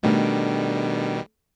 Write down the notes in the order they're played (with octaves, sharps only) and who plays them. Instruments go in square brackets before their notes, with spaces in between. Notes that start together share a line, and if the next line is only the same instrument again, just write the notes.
[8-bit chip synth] B2 D#3 G3 [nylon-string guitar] A3 D4 F5